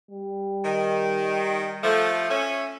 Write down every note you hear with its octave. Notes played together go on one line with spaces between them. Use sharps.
G3
D#3
F3 A3
C#4 E5